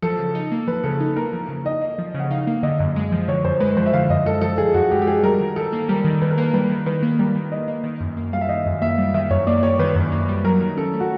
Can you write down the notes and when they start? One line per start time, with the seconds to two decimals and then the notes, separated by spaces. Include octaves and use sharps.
0.02 F3 A4
0.19 C#3
0.35 D#4
0.52 A#3
0.67 F3 B4
0.84 C#3 A4
1.00 D#4
1.16 A#3 A#4
1.33 F3
1.49 C#3
1.65 D#4 D#5
1.81 A#3
1.98 F3
2.14 C#3
2.20 F#5
2.30 D#4 F5
2.47 A#3
2.63 D3 D#5
2.79 F#2
2.96 G#3
3.12 F3
3.28 D3 C#5
3.44 F#2 C5
3.60 G#3 B4
3.77 F3 C5
3.86 E5
3.93 D3 F5
4.10 F#2 D#5
4.25 G#3 A4
4.41 F3 A4
4.58 D3 G#4
4.74 F#2 F#4
4.91 G#3 G4
5.02 G4
5.07 F3 G#4
5.23 G3 A#4
5.40 D#3
5.56 D#3 A4
5.73 A#3
5.89 G3 A#4
6.04 D#3
6.22 D#3 B4
6.30 A#4
6.38 A#3 B4
6.54 G3 B4
6.70 D#3
6.86 D#3 B4
7.03 A#3
7.19 G3 A#4
7.35 D#3
7.52 D#3 D#5
7.68 A#3
7.84 D#3
8.01 F#2
8.17 A#3
8.33 G3 F5
8.41 E5
8.49 D#3 D#5
8.66 F#2
8.81 A#3 E5
8.98 G3
9.14 D#3 E5
9.30 F#2 C#5
9.47 A#3 D5
9.63 G3 C#5
9.79 D#3 B4
9.95 F#2
10.12 A#3
10.28 G3
10.44 F#3 A#4
10.60 D#3
10.77 C#4 A4
10.93 A3
11.00 F#4